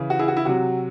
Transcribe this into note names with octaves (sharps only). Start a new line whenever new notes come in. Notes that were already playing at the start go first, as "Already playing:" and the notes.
Already playing: C#3 E3
F#4
E4 G#4
F#4
E4
C3 F#3 F#4